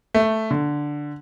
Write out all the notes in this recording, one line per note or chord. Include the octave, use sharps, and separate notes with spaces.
A3
D3